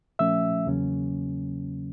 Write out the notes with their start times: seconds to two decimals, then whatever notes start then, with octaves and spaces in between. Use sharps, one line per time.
0.19 A#2 F3 A3 C#4 E5 E6
0.66 E2 C#3 F#3 A#3 C#4